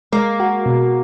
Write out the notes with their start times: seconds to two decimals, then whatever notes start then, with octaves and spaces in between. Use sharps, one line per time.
0.13 G#3 A#3
0.40 F#4
0.66 B2